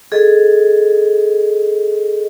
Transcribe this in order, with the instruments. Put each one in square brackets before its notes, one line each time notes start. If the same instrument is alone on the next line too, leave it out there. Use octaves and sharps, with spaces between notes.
[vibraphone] G#4 A4 D#5